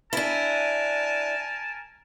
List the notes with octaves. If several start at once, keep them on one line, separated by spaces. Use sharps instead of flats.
D4 E4 A#4 G#5 A5